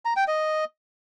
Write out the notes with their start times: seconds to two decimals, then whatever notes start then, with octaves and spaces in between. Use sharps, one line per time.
0.05 A#5
0.16 G5
0.28 D#5